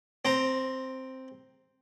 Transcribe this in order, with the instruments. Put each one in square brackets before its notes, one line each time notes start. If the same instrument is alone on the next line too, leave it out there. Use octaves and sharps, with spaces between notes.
[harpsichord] C4 A#5